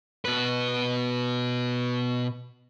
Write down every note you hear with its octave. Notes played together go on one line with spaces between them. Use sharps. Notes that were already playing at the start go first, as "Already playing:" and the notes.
B2 B4